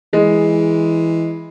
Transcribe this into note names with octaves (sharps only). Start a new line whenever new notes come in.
E3 G#3